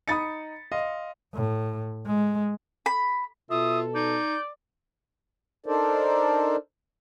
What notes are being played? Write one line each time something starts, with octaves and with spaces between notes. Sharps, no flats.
D#4 B5 D#6 A6 C#7
D#5 F5 C6
A2
G#3
B5
B2 F4 A4 E5 D#6
D#4 D5 G6
D4 D#4 A4 A#4 C5 D5